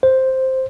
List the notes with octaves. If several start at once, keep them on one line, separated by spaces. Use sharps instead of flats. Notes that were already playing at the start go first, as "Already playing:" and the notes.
C5